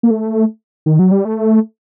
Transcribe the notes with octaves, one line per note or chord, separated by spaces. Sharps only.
A#3
A3
D#3
F#3
G3
A3